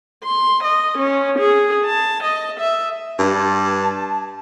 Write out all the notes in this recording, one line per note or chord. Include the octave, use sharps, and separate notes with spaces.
C6
D#5
C#4
G#4
A5
D#5
E5
G2 A5